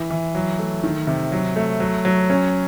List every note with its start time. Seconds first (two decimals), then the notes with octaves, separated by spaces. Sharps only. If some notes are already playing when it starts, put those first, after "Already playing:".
Already playing: E3
0.10 E3
0.35 F#3
0.59 A3
0.83 D#3
1.07 C3
1.32 F#3
1.56 A3
1.80 F#3
2.05 F#3
2.30 C#4